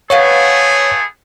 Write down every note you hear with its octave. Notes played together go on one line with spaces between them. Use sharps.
A3 B3 G#4 B4 C#5 F5 F#5